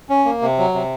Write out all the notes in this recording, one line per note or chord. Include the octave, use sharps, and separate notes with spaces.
C#4
A#3
C3
F#3
C3